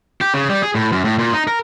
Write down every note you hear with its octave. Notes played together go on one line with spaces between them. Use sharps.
G4
C#3
G3
G#4
A2
F#2
A2
A#2
D#4
A#4